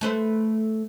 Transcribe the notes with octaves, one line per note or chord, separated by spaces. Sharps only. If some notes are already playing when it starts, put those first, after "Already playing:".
A3 B4 C5